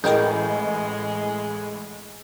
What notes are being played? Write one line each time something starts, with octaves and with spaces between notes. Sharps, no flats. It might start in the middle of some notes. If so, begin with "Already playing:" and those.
A1 A2 G#3 G#4 A#4 D#5 G5 G6